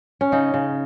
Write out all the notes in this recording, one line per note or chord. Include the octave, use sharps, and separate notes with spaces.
C#4
C#3 D#4
C#3